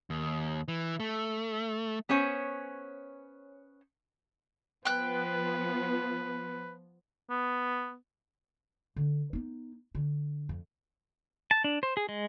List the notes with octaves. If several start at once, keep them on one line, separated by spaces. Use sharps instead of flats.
D#2
E3
A3
B3 C#4 C5 C#5 G#5
F3 B3 B4 G5 F#6
B3
D3
B3 D#4
D3
F2
A5
D4
C5
G#4
G#3